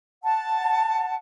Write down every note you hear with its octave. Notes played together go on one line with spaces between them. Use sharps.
F#5 A5